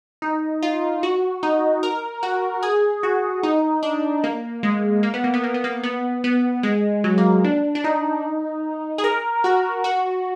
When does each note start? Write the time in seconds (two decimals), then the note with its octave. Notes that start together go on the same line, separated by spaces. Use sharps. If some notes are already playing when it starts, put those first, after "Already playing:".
0.22 D#4
0.63 F4
1.03 F#4
1.43 D#4
1.83 A#4
2.23 F#4
2.63 G#4
3.03 F#4
3.43 D#4
3.83 D4
4.24 A#3
4.63 G#3
5.03 A#3
5.14 B3
5.24 A#3
5.34 B3
5.44 A#3
5.54 B3
5.64 A#3
5.83 B3
6.24 B3
6.63 G#3
7.04 F#3
7.18 A#3
7.44 D4
7.75 D4
7.84 D#4
8.98 G#4
9.04 A#4
9.44 F#4
9.84 F#4